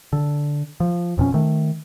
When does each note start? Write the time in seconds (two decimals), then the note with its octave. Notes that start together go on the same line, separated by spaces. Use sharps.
0.13 D3
0.80 F3
1.17 E1 F2 B2 C#4
1.34 D#3 A3